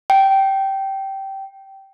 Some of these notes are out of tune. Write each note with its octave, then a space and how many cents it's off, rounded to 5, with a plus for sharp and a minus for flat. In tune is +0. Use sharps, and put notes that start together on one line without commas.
G5 -15